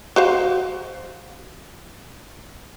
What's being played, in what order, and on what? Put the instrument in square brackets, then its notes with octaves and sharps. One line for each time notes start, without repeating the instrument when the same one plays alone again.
[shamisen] F#4 C5 F5